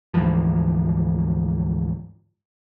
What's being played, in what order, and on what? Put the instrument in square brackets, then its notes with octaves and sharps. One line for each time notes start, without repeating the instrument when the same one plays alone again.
[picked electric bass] D2 G#2 E3 F3